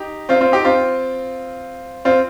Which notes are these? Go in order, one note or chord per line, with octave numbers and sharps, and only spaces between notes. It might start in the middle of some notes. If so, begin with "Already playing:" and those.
Already playing: D#4 G4
C4 F4
C4 F4
D#4 G4
C4 F4
C4 F4